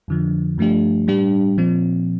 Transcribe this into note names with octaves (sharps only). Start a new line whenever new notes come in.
F2 D3 F3
G2 F3 A3 D4 G4
A2 G3 D4 G4
A#2 F3 C4